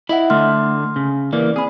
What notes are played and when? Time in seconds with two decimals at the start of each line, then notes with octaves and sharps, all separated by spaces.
0.09 E4 D#5 E5 F#5 B5
0.30 D3 A3 C6 F6
0.96 C#3
1.33 E3 A#3 D5
1.56 C4 G#4 B5